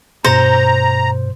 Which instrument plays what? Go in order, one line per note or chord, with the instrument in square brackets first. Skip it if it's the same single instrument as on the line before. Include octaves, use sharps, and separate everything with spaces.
[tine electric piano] G2 B2 C#7 [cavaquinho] C5 [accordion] A#5